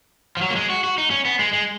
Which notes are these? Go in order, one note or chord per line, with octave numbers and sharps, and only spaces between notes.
F3
F#3
A#3
G#3
F#4
F#4
D#4
C#4
B3
G#3
G#3